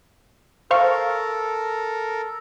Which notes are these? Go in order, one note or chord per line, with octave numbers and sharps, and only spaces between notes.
A4 A#4 C5 F5 C#6